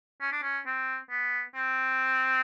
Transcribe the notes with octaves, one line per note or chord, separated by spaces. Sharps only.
C#4
D4
C#4
C4
B3
C4